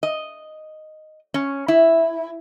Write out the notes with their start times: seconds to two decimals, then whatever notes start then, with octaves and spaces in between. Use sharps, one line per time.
0.03 D#5
1.34 C#4
1.68 E4